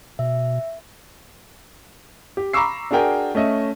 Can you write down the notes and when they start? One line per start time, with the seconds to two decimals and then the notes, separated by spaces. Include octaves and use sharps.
0.19 B2 E5
2.37 G4
2.53 A#5 B5 C#6 D6 E6 C7
2.91 D4 F#4 G#4 A#4 G5 G#5
3.35 A3 C#4 D#5 E5